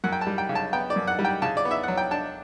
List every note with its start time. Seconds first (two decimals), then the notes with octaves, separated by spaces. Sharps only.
0.04 F#2 F#5
0.12 G5
0.21 A5
0.27 G3
0.38 G5
0.49 C#3
0.55 A5
0.73 B3 G5
0.90 D5
0.96 F#2
1.07 F#5
1.19 G3
1.25 G5
1.42 C#3 A5
1.57 D5
1.65 B3
1.71 E5
1.83 F#3 F#5
1.97 G5
2.11 D4 A5